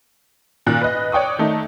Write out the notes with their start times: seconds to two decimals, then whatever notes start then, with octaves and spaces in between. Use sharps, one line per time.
0.67 A#2 D#3 F#6
0.81 B4 D#5
1.12 C#5 D5 G5 C#6 D#6
1.39 D#3 A3 D#4